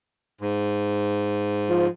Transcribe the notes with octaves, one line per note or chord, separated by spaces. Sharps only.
G#2
F3